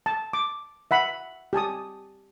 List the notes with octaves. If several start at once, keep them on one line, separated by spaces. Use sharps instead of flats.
A5
D6
E5 F#5 B5
G4 G#5 A5 D#6